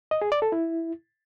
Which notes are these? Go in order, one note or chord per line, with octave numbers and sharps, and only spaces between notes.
D#5
G#4
D5
A4
E4